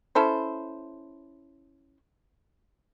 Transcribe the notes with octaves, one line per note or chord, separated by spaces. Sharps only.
C#4 E4 A4 C5